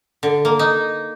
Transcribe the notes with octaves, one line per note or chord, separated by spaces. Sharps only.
D3
A#3
D#4